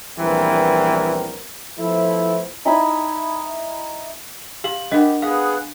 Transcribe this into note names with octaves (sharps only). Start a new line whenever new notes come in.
A#1 E3 G3 B3 C4 A#4
F3 A3 B3 E4
D#4 E4 G#5 B5
G4 F5 F#7
D4 G4 A#4 D#5 F#5
B3 G#4 F5 F#5